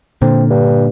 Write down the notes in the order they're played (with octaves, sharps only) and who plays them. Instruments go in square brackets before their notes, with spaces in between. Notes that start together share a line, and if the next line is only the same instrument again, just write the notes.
[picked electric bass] A#2 D3 [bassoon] C4
[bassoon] G2